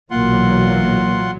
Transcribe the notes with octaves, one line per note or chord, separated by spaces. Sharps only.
B1 A#2 E3 F#3 A#3 F4 F#5 C6